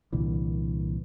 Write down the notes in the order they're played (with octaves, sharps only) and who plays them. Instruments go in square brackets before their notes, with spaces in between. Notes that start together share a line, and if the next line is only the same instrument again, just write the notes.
[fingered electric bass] C2 A#2 D3 E3